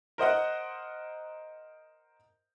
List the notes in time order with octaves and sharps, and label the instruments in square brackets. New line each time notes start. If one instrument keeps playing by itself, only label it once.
[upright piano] A#4 C5 D#5 F#5